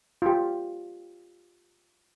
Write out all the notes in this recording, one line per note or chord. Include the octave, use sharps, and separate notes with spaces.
F4 G4